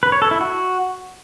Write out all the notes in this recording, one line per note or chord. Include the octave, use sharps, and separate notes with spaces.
B4
C#5
A4
E4
F#4